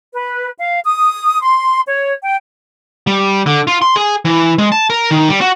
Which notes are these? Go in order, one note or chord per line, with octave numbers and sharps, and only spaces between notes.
B4
F5
D#6
C6
C#5
G5
G3
D3
F4
C6
G#4
E3
G#3
A5
A#4
D#3
G3
F#4